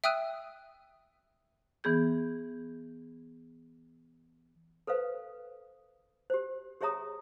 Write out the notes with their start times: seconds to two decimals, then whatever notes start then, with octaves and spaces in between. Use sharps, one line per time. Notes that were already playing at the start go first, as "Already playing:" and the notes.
0.04 E5 G5 D#6 E6 F#6 D#7
1.84 E3 B3 G#4 G6
4.87 A4 B4 C5 F5
6.30 G4 C5
6.81 G4 G#4 C#5 E5 A#5 D#6